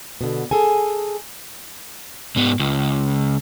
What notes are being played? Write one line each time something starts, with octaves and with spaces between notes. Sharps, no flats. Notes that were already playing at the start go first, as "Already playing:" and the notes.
B2 D3
G#4 A4 G#5
G#2 B3
C#2